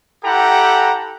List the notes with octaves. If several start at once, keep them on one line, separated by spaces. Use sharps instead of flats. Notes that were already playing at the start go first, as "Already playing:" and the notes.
E4 G4 A4 F#5 G5 A#5